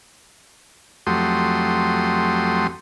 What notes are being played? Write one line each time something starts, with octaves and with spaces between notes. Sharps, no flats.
F2 F#3 A3 G4 C6 D#6